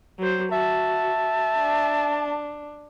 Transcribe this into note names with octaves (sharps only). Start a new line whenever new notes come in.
F#3 C5
F#4 E5 A5
D4